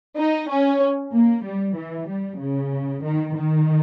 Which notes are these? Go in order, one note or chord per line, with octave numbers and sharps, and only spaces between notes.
D#4
C#4
A#3
G3
E3
G3
C#3
D#3
D#3